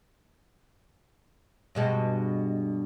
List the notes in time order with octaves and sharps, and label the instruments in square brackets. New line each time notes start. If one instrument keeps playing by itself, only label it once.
[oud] G2 B2 G#3